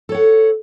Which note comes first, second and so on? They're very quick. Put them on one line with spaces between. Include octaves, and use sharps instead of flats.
A4 C#5 F#5